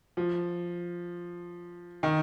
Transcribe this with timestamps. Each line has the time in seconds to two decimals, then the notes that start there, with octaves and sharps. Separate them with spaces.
0.17 F3
2.03 D#3